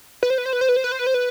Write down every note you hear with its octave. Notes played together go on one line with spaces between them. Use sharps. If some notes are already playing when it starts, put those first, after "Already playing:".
B4
C5
B4
C5
B4
C5
B4
C5
B4
C5
B4
C5
B4